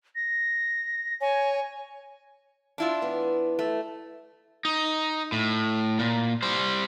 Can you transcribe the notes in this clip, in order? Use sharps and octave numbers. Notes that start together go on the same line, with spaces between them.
A#6
C#5 G#5
D4 E4 F4
E3 B3
A3
D#4
A2
A#2
G3 C5